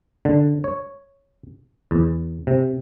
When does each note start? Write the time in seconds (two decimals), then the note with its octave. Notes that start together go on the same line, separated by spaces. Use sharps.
0.25 D3
0.64 C#5
1.91 E2
2.47 C3